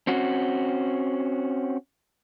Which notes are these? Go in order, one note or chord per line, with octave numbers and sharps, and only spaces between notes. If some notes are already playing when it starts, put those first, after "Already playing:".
C4 C#4 F#4